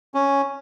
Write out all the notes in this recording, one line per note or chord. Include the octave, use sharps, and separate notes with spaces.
C#4